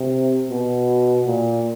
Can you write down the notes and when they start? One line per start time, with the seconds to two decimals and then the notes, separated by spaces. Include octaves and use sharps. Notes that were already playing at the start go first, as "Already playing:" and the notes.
Already playing: C3
0.51 B2
1.27 A#2